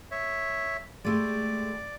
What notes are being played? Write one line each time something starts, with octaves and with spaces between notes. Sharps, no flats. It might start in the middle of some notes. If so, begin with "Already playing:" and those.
C#5 E5
G#3 A3 G4 D5